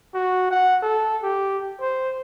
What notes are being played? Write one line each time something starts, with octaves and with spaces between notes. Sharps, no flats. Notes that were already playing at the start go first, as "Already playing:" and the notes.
F#4
F#5
A4
G4
C5